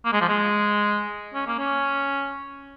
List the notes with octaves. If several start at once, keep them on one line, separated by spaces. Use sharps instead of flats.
A#3
G#3
F3
G#3
C#4
A#3
C#4